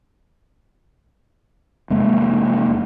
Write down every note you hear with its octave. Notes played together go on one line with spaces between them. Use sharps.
F1 G#3 A#3